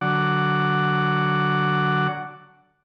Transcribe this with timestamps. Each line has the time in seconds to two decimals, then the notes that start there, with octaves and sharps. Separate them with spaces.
0.01 D3 F#3 F#5 D6